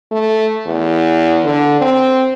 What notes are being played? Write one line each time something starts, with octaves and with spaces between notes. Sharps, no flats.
A3
E2
D3
C4